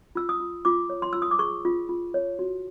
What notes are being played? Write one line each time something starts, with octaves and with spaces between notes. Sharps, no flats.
F4 E6
D#6
F4
F4 D6
C#5
C6
F4 E6
D#6
D6
G#4 C#6
F4
F4
C#5
F#4